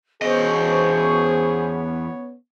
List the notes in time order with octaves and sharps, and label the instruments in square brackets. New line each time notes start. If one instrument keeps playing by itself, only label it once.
[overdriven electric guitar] E2 D#5 [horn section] B3 C#4 C#5 [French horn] G#4 [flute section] C5 C#6